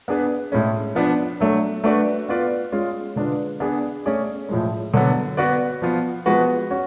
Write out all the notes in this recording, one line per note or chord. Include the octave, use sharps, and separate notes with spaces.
B3 D4 G#4 B4
A2 G#3 C#4
F3 B3 D4
F#3 A3 D4
A3 D4 F#4 B4 D5
B3 F4 B4 D5
G#3 C#4 F4
D3 G#3 D4 F4 B4
B3 D4 G#4
A3 C#4 G#4 D5
A2 F3 G#3
D3 F#3 B3
B3 F#4 B4 D5
F3 B3 F4
F3 G#3 B3 F#4 B4
C#4 F#4